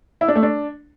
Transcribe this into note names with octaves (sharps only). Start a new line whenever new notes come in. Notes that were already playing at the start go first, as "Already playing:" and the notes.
E4
D4
A3
D4